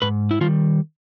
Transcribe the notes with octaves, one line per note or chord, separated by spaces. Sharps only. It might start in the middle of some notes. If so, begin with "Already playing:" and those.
G#2 B4
E4
D#3 G3 F4